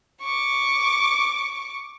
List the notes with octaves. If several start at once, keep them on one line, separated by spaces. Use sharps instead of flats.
C#6 D6